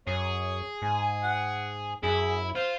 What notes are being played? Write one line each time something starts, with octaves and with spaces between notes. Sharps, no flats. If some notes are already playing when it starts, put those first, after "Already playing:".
F#2 G#4 C#5
G#2 G#5
F#5
F#2 E4 G#4
F4 C5